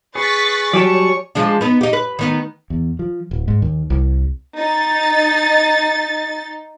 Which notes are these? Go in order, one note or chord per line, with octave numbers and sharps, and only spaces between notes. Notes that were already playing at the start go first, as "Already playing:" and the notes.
G#4 B4 C#5 C#6 A6 B6
F#3 G3 G4 C#5 D5 G#5 A5 C#6
F3 G#3 D4
B3 D#4
D#4 G4
B4
D#3 B3 D#4
E2
F3
D1
G#2
D#2
C2
D#4 A6